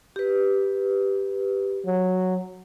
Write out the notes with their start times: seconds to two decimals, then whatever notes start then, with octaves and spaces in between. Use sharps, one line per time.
0.16 G4 B4
1.86 F#3